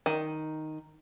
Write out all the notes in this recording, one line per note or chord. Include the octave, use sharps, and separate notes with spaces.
D#3